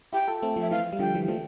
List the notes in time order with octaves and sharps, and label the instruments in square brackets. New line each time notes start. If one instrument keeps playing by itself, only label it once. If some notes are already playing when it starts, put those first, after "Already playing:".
[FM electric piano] E4 G4 [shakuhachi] G5
[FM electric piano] F4 A4
A3 C4
F3 A3
[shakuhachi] E5
[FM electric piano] E3 [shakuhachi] F5
[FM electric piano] G3
[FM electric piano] D3 F3 [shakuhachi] G5
[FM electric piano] E3 G3
F3 A3